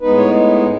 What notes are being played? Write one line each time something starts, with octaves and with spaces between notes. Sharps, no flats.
A2 G#3 B3 D#4 B4
C#5